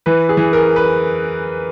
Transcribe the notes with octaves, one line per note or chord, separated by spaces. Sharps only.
E3 B4
G#4
E3
A#4
B4